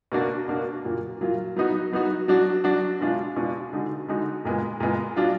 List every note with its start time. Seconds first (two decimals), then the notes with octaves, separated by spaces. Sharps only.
0.12 B2 A#3 D4 F#4
0.48 B2 A#3 D4 F#4
0.85 A#2 F#3 A#3 F4
1.20 A#2 F#3 A#3 F4
1.56 F#3 B3 D#4 F#4
1.92 F#3 B3 D#4 F#4
2.28 F#3 D4 F#4
2.64 F#3 D4 F#4
3.01 B2 G#3 D4 F4
3.36 B2 G#3 D4 F4
3.73 D3 G#3 D#4 F#4
4.08 D3 G#3 D#4 F#4
4.45 A#2 G#3 B3
4.80 A#2 G#3 B3
5.17 F#3 D4 F4